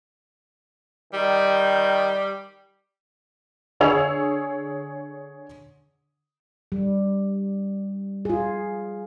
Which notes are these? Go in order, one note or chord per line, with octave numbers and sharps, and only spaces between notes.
D#3 G3
D3 G#4 C#5 E6 F7
G3
F4 G#4